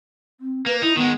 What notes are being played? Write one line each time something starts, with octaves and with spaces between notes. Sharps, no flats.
C4
A#3 B4
D#4 E4
D#3 G#3 B3